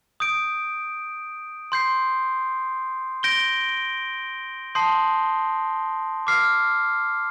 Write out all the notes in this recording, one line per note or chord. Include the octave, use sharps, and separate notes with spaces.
D#6 G6 D7
C6 G6 C7
G6 A#6 D7 G7
A5 C6 D#6 G6 C7
D6 F6 C7